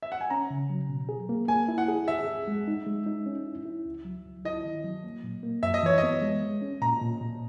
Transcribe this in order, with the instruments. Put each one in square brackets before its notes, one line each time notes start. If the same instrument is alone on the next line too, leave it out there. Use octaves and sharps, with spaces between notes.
[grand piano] E5
F#5
G#5
[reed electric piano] C#4 [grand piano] A#5
[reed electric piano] C#3
F#3
B2
G#4
A#3
[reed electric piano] A#3 [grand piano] G#5
[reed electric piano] E4
[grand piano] F#5
[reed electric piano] G#4
[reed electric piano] G#4 [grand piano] E5
[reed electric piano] G#4
G#3
D#4
G#3
D#4
C#4
E4
E4
C#2
F#3
C#2
[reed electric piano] E4 [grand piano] D#5
[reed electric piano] D#3
F#3
A#3
A#2
A#3
[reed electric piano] F#2 [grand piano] E5
[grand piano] D#5
[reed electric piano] E3 [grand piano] C#5
[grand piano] D#5
[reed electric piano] B3
G#3
G#3
C#4
[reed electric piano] A#2 [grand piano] A#5
[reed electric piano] A#2
A#2